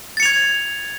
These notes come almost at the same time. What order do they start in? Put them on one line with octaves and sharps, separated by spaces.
A6 C#7 F7 G#6